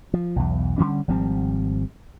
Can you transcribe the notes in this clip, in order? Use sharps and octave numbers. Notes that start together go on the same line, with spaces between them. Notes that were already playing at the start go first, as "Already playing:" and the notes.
F3
B1 E2
D3 E3 G3 C#4
G#1 F3 G3 C4